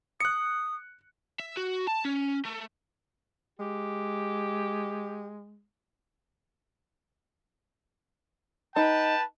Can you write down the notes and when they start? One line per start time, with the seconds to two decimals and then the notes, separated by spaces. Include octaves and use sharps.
0.20 D#6 F#6 C#7
1.39 E5
1.57 F#4
1.88 A5
2.05 C#4
2.45 A3
3.59 G#3 G4
8.76 D#4 B4 G5 A5